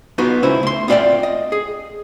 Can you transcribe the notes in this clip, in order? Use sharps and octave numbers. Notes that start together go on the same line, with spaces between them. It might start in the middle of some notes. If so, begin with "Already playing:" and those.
B3 D#4 F4 F#4 B4
C#2 C#4 E4 C5 E5
A3 C6
B3 C4 F4 D5 E5 G5
D#5
G#4